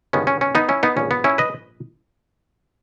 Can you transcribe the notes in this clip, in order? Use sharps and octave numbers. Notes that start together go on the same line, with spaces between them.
G1 G2 D#3 G#3 B3 C#4
C#4
C#4
B3 D#4
C#4 E4
B3 D#4
A#1 G#2 G3 B3 C#4
B3
C#4 E4
B4 D#5